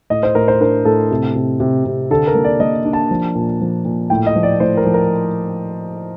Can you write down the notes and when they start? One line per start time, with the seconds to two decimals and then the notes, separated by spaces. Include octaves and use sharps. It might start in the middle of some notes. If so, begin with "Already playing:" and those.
0.10 A2 D#5
0.23 C5
0.35 A2 A#4
0.48 C5
0.60 D4 A#4
0.85 A2 A4
1.11 C3
1.35 C3
1.60 C3
1.85 C3
2.10 D3 A4
2.27 A#4
2.35 A#3
2.44 D5
2.60 A#3 D#5
2.85 D4
2.93 A5
3.11 F3
3.35 A#2
3.61 F3
3.85 A#2
4.10 A2 G5
4.26 D#5
4.35 F3
4.43 D5
4.60 A2 C5
4.77 A#4
4.85 F3
4.94 A#4